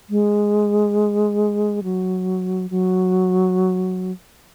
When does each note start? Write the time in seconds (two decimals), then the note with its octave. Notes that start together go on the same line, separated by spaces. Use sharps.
0.10 G#3
1.83 F#3
2.70 F#3